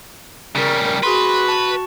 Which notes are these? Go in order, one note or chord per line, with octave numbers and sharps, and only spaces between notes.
C#3 G3 A#4
F#4 G#4 B4 C6
A5 C#6